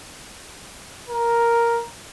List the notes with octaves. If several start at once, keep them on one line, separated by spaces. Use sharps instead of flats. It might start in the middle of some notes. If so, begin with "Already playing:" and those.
A#4